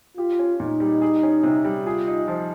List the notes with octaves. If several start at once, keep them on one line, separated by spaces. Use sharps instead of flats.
F4 G4
C#4
A#2 D#4
G3
G#4
C#4
C3
G3
F4 G#4
D#4
F3